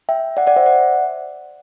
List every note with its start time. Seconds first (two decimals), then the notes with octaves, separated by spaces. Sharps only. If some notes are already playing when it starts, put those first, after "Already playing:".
0.09 E5 G5
0.37 D5 F#5
0.47 D5 F#5
0.56 C5 E5
0.66 D5 F#5